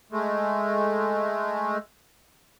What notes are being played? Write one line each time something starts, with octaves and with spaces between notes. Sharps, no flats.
G#3 A3